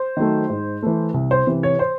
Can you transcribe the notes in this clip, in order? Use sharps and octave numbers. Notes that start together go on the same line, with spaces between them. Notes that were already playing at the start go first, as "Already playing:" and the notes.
Already playing: C5
D#3 F#3 A3
G#2
E3 A3
C2
C5
C3 E3
C#5
C5